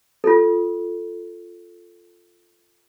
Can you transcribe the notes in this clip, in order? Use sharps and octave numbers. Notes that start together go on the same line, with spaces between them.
F4 A4